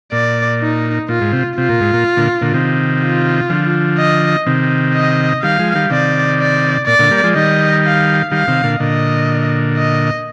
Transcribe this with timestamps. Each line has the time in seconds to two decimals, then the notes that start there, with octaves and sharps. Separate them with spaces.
0.12 A#2 D5
0.61 D#4
1.09 A#2 F4
1.21 G#2
1.33 C3
1.57 C3 F4
1.69 A#2
1.81 G#2
1.93 A#2
2.17 A#2 D3
2.42 A#2 D3
2.54 C3 D#3
3.02 F4
3.50 D3 F3
3.98 D#5
4.46 C3 D#3
4.94 D#5
5.43 D#3 G3 F5
5.59 F3 G#3
5.75 D#3 G3
5.90 C3 D#3 D5
6.39 D5
6.87 A#2 D5
6.99 A#2 D3
7.11 G3 A#3
7.23 F3 G#3
7.35 D#3 G3 D#5
7.84 F5
8.31 D#3 G3 F5
8.47 C3 D#3
8.64 A#2 D3
8.80 A#2 D3 D#5
9.77 D#5